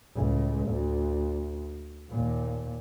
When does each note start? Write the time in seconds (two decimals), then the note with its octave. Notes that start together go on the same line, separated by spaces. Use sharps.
0.15 C#2 A2
0.69 D2
2.10 D#2 A#2